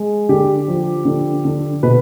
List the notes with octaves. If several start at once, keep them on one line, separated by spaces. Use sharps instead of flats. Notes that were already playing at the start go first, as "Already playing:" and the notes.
Already playing: G#3
D3 G4
F3
D3
D3
B2 B4